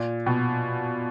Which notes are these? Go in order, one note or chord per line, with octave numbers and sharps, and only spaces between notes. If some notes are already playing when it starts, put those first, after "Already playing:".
Already playing: A#2
B2